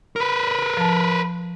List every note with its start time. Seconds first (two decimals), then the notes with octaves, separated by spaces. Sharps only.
0.16 A#4 B4
0.77 F3 A5